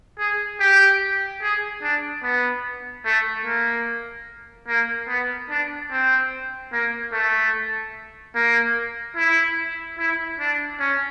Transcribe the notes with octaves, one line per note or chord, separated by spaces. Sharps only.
G#4
G4
G#4
D4
B3
A3
A#3
A#3
B3
D4
C4
A#3
A3
A#3
E4
E4
D4
C#4